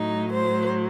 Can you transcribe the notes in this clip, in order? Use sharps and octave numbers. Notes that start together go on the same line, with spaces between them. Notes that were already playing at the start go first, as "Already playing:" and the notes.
Already playing: A2 F#3 D#4
C5